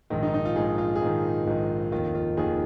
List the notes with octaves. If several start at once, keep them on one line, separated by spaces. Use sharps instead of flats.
A#1 G#2 D#3
D#4
D#4
F4
A#1 G#2 D#3 G#4
F4
G#4
A#1 G#2 D#3 F4
A#1 G#2 D#3
F1 D#2 D#3 F4
F4
F1 D#2 D#3 G#4